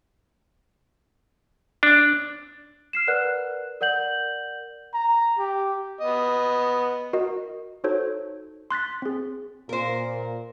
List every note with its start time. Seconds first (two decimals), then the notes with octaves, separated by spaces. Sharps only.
1.83 D4
2.93 F6 C7 E7
3.07 A#4 B4 D5 F#5 F#6
3.81 A#4 D5 F#5 G6 F#7
4.94 A#5
5.38 G4
6.01 B3 D#5
7.13 F#4 A#4 D#5
7.84 D#4 F#4 A4 C5 C#5
8.71 C6 F#6 A6 B6
9.02 C4 G#4
9.69 A#2 A#4 C5